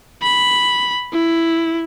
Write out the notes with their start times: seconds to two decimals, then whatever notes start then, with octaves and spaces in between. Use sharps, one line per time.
0.23 B5
1.13 E4